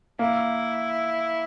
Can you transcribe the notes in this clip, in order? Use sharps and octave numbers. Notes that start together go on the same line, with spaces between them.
A#3 E4